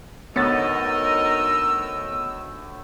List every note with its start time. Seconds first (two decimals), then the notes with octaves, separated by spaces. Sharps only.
0.36 D2 B3 D#4 A#4 C#5 D#5 E6 A6